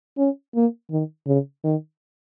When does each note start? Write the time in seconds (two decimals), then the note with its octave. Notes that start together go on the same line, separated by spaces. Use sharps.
0.18 C#4
0.55 A#3
0.91 D#3
1.27 C#3
1.64 D#3